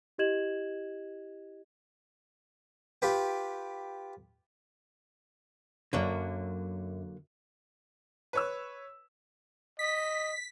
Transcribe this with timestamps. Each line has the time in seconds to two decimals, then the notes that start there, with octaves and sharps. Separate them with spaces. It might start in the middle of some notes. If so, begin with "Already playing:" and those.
0.18 E4 G4 D#5 G#6 E7 F#7
3.02 F4 G4 B4 G5
5.93 F#2 D3 F#3 A#3
8.33 B4 C#5 E6
9.79 D#5 B6